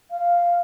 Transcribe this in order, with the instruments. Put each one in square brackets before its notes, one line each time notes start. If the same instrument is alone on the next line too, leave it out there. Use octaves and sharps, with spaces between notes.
[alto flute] F5